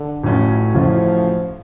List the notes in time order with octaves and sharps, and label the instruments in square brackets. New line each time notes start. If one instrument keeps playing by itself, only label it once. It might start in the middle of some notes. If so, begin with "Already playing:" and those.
Already playing: [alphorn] D3
[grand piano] A1 A2 F#3 C#4 F4
[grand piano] A1 A2 F#3 C#4 F4 [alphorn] F3